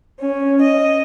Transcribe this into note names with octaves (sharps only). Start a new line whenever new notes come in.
C#4
D#5